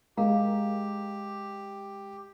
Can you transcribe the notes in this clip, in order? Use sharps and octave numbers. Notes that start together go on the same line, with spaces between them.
G#3 G4 A#4 F5 A#5